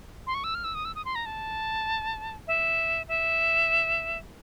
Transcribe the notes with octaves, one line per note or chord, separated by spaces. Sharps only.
C6
C#6
E6
F6
E6
D#6
E6
D#6
C6
A#5
A5
E5
E5